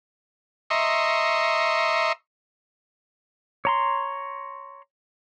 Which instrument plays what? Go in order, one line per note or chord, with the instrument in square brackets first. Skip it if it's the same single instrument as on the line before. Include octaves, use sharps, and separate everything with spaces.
[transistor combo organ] D#5 E5 A#5 C6 C#6
[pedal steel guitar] C#5 A#5 C6